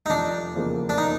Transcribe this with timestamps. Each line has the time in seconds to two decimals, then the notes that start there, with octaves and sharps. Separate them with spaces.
0.06 D#4
0.10 F1 D4
0.53 E2 C#3 F3 A#3
0.89 D4
0.98 D#4